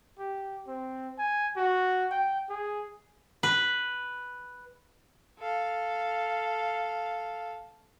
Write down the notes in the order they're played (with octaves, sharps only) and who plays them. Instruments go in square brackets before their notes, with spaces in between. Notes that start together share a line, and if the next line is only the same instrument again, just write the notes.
[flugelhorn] G4
C4
G#5
F#4
G5
G#4
[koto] B4
[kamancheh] A4 F5